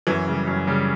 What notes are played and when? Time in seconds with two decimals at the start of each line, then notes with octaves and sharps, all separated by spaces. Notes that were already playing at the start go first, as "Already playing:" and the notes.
0.07 F#2 E3
0.27 C#3 G3
0.47 F#2
0.67 C#3 G3